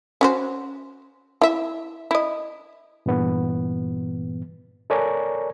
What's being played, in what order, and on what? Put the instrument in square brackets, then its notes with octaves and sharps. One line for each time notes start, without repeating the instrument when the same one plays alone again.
[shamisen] C#4 F#4 C5
E4 E5
E4 D#5
[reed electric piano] G2 A#2 E3 B3
A4 A#4 C#5 D5 G#5 A#5